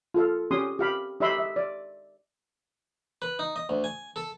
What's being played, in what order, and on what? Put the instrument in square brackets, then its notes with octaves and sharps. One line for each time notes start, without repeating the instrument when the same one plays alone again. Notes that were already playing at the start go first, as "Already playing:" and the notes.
[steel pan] F4 A4 F5
C#4 G4 C6 D#6
G4 F5 B5
D#4 G4 D#5 E5 B5 C6
E5
D5
[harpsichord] B4
D#4
D#5
D2
G#5
A4